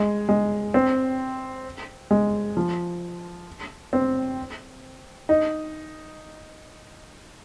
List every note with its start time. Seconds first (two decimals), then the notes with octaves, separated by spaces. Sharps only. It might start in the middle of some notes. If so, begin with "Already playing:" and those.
Already playing: G#3
0.29 G#3
0.74 C4
2.11 G#3
2.57 F3
3.93 C4
5.29 D#4